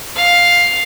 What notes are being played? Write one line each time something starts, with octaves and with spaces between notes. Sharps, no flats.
F5